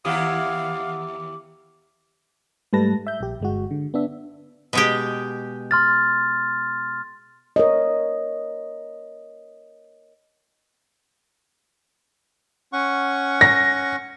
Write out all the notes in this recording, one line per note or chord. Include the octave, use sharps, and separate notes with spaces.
D#2 E4 G4 F5 F#5 D6 D#6
G#2 G3 A3 B4 A5 A#6
E5 G6
A#1 G4
G1 G#3 F#4
D3
B3 D4 E5
B2 G#3 G4
C6 F6 A6
A#4 C#5 D#5
C#4 F#5 C#6
A#6